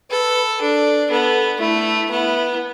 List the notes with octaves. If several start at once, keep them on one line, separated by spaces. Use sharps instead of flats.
A4 B4
D4 A4
B3 A4
A3 E4
B3 E4